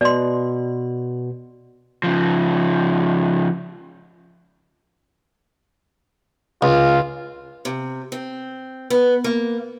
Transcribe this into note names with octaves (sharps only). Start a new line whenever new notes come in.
B2 D5 C6
C#3 F3
C#2 F4
C3
C4
B3
A#3